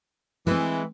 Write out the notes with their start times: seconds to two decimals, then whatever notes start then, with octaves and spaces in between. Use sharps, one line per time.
0.47 E3 G#3 C4